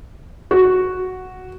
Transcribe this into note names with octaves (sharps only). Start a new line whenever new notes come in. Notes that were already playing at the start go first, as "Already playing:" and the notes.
F#4